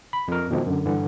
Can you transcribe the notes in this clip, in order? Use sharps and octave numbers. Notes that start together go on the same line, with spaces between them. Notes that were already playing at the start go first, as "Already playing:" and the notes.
B5
F2 A#4
B2 D#3 F3 G#3
F#2 D3
G2 D3 E3